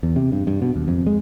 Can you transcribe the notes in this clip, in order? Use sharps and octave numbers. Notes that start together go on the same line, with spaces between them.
E2
C3
G2
G2
B2
D#2
F2
G#3